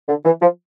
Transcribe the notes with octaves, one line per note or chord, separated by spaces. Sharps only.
D3
E3
F3